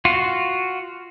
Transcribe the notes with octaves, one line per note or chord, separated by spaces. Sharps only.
F4 F#4